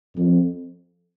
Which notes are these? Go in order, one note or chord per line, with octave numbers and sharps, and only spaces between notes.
F2